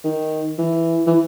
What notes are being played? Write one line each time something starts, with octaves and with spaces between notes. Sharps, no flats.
D#3
E3
E3